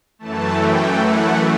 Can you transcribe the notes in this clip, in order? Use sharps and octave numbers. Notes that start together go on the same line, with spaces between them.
F#2 E3 A3 A5
G5
F#5